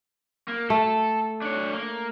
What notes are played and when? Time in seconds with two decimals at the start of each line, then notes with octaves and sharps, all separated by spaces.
0.48 A#3
0.70 A3 A4
1.42 D4 C#5
1.74 A#3